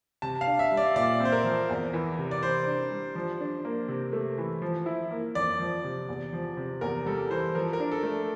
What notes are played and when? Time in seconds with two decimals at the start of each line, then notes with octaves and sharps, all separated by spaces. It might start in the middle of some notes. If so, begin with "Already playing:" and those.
0.22 C3 A5
0.41 F5
0.47 D4
0.59 E5
0.72 G3
0.77 D5
0.96 A#2 D5
1.20 C4
1.25 C5
1.32 A#4
1.44 F3
1.69 E2
1.93 E3
2.18 C3
2.31 D5
2.43 E3 C5
2.67 D4
2.91 G3
3.15 F3
3.40 D4
3.65 A#3
3.88 C3
4.13 A3
4.38 E3
4.62 F3
4.86 E4
5.11 A#3
5.35 F2 D5
5.59 F3
5.84 C3
6.09 E2
6.33 F3
6.57 C3
6.81 E2 A#4
7.06 G3 A4
7.30 E3 C5
7.55 F3 A#4
7.73 A#4
7.80 D4
7.92 A4
8.03 A3